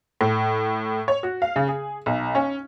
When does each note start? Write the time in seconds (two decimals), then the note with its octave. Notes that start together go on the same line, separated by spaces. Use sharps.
0.21 A2
1.08 C#5
1.23 F#4
1.42 F5
1.56 C#3
1.68 G#4
2.06 B1
2.35 C#4